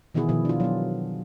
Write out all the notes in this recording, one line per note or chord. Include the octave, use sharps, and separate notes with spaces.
B2 D#3 E3 B3 E4 G#4
B2 D#3 F3 B3
D4 F4
F#3 B3